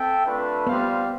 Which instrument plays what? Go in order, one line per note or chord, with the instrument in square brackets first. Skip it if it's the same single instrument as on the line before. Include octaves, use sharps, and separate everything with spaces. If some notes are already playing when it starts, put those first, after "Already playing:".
Already playing: [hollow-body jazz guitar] C4 [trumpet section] A4 E5 G5
[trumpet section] A3 D4 F4 B4
[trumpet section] G3 C4 F4 C5 F5 [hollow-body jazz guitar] B3